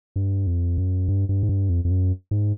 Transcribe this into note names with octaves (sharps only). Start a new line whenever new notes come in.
G2
F2
F#2
G2
G2
G#2
G2
F2
F2
F#2
G#2